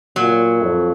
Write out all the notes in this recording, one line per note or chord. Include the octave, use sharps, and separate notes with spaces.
A#2 F#3
F2